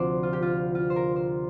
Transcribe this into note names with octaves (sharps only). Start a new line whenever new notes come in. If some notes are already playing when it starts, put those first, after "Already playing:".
Already playing: D2 C3 F3 C5 D5
F4
G4
F4
F4
C5
A#4
C5